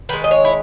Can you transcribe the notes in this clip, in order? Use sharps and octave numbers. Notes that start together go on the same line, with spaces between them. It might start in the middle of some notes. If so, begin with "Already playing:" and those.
D#3 G#3 B4
D#5
C#5
E4